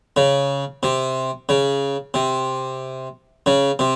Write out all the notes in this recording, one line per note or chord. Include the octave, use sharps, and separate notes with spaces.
C#3
C3
C#3
C3
C#3
C3